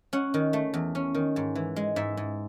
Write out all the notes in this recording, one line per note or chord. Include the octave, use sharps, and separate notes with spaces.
C#4 F#5
D#3
A3
E2
C#4
D#3
G#2
E3
G#3
G#2 E5
G#2